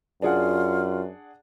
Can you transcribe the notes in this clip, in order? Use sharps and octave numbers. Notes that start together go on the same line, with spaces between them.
F#2 D4 F4 G#4 F#5